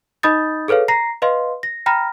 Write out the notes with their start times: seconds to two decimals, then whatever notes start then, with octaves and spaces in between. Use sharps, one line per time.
0.23 D#4 D#5 B5 D#6 G6 A6
0.68 G#4 A4 B4 C#5 F5
0.88 A#5 A#6 C7
1.22 B4 D#5 F5 C6
1.63 A#6
1.86 G5 A#5 B5 F6 A#6